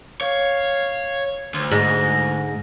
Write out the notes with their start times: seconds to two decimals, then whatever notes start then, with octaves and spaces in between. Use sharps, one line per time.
0.21 C#5 F5
1.54 D2 C6
1.72 G#2 A#6